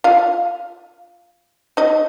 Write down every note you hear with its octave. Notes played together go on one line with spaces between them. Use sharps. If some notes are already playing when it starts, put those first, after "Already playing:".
F4 F5
D#4 D#5